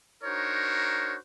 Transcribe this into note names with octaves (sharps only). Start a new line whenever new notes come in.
D4 D#4 F#4 A#4 C5 C#5